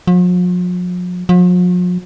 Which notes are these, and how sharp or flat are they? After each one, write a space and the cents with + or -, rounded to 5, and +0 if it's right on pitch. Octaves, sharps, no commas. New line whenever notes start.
F3 +45
F3 +45